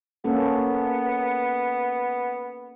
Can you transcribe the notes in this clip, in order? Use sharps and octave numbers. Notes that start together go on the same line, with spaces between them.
A#3 B3 C#4 A4